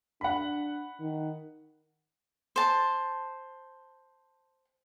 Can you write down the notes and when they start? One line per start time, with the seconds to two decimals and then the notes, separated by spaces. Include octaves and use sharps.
0.21 D4 F#5 B5
1.00 D#3
2.56 C5 A5